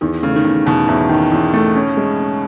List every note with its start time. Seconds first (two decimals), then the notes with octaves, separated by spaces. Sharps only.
0.01 E2 D#3
0.22 C#3 A3
0.36 D#3
0.44 E2 C#3
0.66 E2 B2
0.88 E2 A2
1.09 D#3
1.32 E2
1.53 A3
1.75 C#4
1.97 G#3
2.19 C#4